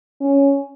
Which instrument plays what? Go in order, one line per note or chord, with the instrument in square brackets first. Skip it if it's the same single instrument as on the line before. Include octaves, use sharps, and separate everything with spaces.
[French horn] C#4